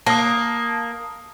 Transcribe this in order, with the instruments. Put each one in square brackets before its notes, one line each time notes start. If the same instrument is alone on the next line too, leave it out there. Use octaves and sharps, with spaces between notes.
[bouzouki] A#3 [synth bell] A5 D#6